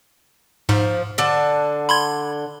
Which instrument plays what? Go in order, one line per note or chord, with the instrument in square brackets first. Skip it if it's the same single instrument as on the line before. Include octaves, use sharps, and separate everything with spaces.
[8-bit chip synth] G#2 [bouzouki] F3
[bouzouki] D3 D4 A5
[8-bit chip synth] B5 C6 G#6